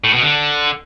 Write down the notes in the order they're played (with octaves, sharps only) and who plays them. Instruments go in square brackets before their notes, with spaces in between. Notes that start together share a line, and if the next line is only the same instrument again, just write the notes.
[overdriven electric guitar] A2
B2
D3